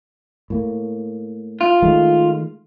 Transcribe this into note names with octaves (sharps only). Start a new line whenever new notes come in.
A2 A#3
F4
D#3 G#3 A3